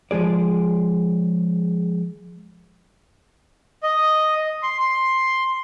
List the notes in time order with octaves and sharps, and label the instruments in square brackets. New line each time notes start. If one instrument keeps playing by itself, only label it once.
[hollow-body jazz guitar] F3 G#3 G#4 D5
[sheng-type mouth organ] D#5
C6
C6